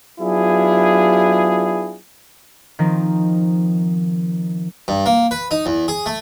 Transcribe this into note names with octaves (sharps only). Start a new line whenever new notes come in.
F#3 B3 D4 E4 F4 G#4
D#3 F3 C4 D#4
G2
A#3
B4
D#4
E2
G#4
A3